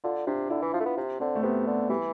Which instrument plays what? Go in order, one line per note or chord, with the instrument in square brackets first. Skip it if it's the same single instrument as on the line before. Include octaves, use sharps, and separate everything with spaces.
[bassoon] D3 [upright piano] F4
[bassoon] C3 [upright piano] D4
[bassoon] D3 [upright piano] E4
[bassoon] E3
[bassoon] F3 [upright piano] F4
[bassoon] A3
B3
C3
[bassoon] D3 [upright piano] C4
[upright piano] A3
[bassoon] C3 [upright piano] B3
[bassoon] D3
[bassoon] E3 [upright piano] G3